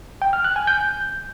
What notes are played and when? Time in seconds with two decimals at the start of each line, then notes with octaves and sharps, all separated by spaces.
0.22 G5
0.33 F6
0.45 F#6
0.56 G#5
0.67 G6